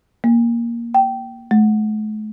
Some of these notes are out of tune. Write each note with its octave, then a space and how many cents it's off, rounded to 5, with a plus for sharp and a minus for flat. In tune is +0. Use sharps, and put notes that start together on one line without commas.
A#3 +5
G5 -15
A3 -45